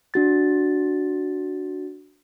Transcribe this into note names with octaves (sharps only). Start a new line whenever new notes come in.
D4 F#4 A6